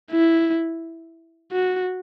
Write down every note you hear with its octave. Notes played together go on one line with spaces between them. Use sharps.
E4
F#4